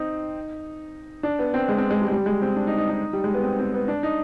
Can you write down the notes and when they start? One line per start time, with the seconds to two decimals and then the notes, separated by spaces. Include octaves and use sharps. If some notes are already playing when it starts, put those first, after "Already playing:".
Already playing: C4 D#4
1.23 D4
1.39 B3
1.54 C4
1.69 G#3
1.78 C4
1.90 G#3
2.01 G3
2.08 G#3
2.12 G3
2.26 G#3
2.42 C4
2.56 D4
2.67 D#4
2.77 D#4
2.89 D#4
3.13 G3
3.24 G#3
3.34 B3
3.43 C4
3.59 C4
3.74 B3
3.88 D4
4.03 D#4